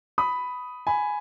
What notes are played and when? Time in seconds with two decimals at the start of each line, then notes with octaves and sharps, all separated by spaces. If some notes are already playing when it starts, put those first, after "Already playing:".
0.18 B5 D#6
0.87 G#5 B5